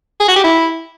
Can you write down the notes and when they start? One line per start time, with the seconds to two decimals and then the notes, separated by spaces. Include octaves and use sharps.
0.20 G#4
0.28 F#4
0.36 G4
0.44 E4